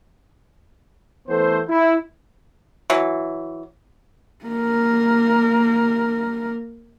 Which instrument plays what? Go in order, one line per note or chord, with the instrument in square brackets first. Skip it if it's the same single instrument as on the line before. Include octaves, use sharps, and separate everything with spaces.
[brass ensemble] E3 A3 B3 A4 C5
E4
[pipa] E3 F#3
[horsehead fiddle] A#3 A#4